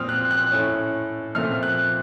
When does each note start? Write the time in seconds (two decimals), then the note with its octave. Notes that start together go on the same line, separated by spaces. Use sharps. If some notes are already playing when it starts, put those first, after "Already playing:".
Already playing: A#2 F3 C4 D#6 F6
0.09 F#6
0.31 F#6
0.51 A2 A3 C#4
1.35 A#2 F3 A3 C4 F6
1.63 F#6